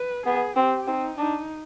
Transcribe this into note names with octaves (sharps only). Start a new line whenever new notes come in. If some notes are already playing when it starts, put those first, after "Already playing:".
Already playing: B4
B3 G#4
C4 G4
C4 D#4
D4 D#4